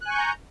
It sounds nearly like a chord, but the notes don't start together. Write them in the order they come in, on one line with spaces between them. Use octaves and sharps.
F#6 G#5 C#6 G6 A#5